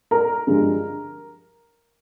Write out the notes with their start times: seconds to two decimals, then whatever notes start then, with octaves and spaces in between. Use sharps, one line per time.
0.11 A#4 A#5
0.47 G2 D3 F3 G#3